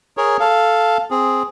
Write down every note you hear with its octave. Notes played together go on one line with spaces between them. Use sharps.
G#4 A#4 C#5
A4 F5
C4 G#4